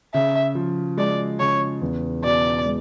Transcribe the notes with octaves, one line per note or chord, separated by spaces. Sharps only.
C#3 E5
F3
G#3 D5
C#3 C#5
E2
B2 D5
G#3